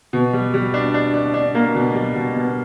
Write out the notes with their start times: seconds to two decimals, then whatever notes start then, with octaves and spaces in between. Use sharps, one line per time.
0.13 B2
0.33 G3
0.54 G3
0.74 D4
0.94 D4
1.14 D4
1.34 D4
1.55 A#3
1.75 B2
1.95 G3
2.15 B2
2.35 B2